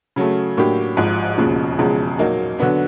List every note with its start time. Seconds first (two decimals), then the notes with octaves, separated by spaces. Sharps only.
0.16 C#3 F#3 A3
0.57 A2 F#3 A#3 D4 G4
0.97 G#1 G#2 F3
1.38 E1 D#2 C#3 F3
1.78 E1 E2 C#3 F3 G#3
2.19 A#2 F#3 A#3 D#4
2.59 D3 F#3 B3 D4